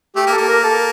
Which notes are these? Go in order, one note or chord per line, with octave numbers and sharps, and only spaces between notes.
A3 G4
A#3
A4
A#3
A#4
A4